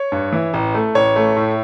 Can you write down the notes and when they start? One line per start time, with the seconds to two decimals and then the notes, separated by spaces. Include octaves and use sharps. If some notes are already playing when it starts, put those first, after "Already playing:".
Already playing: C#5
0.12 G2
0.32 E3
0.54 A1
0.74 A3
0.95 A1 C#5
1.16 A3
1.37 A2